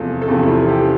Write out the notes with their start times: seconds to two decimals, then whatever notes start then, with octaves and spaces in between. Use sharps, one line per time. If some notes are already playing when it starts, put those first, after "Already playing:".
Already playing: E2 C3 F3 A4
0.22 A4
0.28 E2 C3 F3 G4
0.43 E4
0.48 F4
0.68 G4